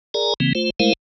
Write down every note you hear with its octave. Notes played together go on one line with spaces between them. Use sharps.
G#4 A#4 D5 G#5 A#5
C#3 E3 A#3 C4
A3 F4 C5
G#3 A3 E4 A#4 C5 F5